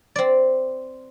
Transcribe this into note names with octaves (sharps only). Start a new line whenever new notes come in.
C4 D5